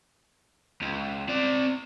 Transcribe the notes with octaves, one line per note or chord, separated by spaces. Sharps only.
C#2
C4 D5